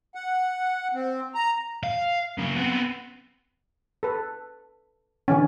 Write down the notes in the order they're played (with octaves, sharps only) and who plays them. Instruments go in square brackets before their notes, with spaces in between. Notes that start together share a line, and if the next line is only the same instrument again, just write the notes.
[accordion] F#5
C4
A#5
[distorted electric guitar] F5
C#3 F#3
B3 C4
[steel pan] A4 B4
D3 E3 C#4